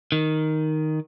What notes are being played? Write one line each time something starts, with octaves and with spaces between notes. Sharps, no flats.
D#3